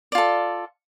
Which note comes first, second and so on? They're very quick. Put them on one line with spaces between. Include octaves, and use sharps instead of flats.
D5 F4 A4